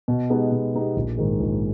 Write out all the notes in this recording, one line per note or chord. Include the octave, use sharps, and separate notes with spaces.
B2
G#3 B3 D#4 G4
B2
G#3 B3 D#4 G4
A#1
G#2 D#3 G#3
A#1